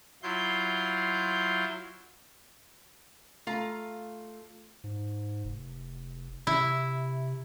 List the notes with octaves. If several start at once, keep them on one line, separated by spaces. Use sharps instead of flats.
F#3 E4 F4 C6 G6
A3 F4 F5 A#5
G#2
F1
C3 E4